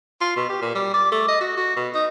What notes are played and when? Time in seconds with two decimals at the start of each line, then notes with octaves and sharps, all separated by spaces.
0.21 F4
0.36 B2
0.49 G4
0.62 A#2
0.75 G3
0.94 D5
1.12 A3
1.28 D#5
1.40 F#4
1.57 F#4
1.76 B2
1.94 D#4